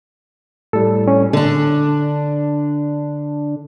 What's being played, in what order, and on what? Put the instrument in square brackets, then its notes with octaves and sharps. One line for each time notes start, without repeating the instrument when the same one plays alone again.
[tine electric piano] A2 G3 [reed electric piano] A4
[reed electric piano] C#4
[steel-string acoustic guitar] D3 D4